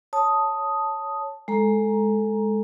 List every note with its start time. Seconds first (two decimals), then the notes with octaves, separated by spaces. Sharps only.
0.13 C#5 A5 D#6
1.48 G#3 A4 A#5